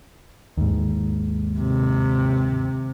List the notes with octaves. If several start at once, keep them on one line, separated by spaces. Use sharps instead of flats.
D#2 G#2
C3